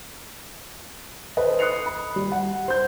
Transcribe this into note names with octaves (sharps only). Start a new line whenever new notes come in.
A4 B4 C5 D#5
D#6 F#6 C7 C#7 F7
B5
G3
F#5
C5 G6